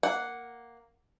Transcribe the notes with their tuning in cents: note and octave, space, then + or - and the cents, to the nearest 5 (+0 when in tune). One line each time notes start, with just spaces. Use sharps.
A#3 +0 F#5 +0